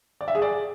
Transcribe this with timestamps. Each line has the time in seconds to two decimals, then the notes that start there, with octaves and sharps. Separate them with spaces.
0.21 D5
0.28 E5
0.35 G#4
0.42 D5